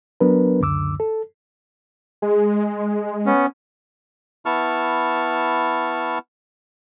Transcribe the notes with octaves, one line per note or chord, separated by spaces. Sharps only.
F#3 B3 D4 A#4 B4
C#2 F#2 D3 D6 E6
A4
G#3 G#4
B3 C#4
B3 E4 A5 C#6 F6